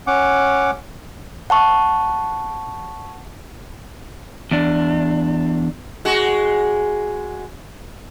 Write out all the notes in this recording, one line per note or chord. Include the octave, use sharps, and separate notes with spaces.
C#4 F#5 D6
F#5 A5 C#6
E2 D4
G#3 F#4